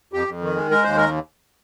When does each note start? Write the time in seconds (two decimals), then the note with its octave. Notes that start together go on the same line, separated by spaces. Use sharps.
0.13 F2 G4
0.27 F2
0.42 D#3
0.56 G#3
0.71 G#3 A#4
0.84 D#2 C5
0.97 A#4